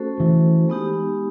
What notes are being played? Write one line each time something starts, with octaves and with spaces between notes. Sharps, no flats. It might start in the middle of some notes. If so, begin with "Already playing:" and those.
Already playing: A3 C#4 F#4 A4 C5
E3
G#3 B3 D#4 G4